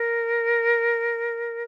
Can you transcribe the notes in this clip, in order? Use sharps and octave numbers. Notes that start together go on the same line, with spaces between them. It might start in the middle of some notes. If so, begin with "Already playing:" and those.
Already playing: A#4